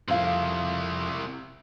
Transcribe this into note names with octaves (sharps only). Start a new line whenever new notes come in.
F2 C3 E4 F5